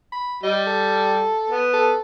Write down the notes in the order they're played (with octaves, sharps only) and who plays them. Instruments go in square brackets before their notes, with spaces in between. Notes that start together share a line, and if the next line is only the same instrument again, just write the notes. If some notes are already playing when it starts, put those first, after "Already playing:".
[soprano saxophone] B5
[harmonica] G3 [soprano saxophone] D#5
[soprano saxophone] A4
[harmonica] B3
[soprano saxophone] A4